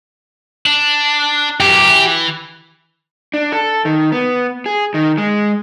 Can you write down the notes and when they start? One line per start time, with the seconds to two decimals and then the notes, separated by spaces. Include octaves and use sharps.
0.66 D4
1.60 F#2 E3 G4
1.88 E3
3.34 D4
3.52 A4
3.85 D#3
4.12 B3
4.66 G#4
4.94 D#3
5.18 G#3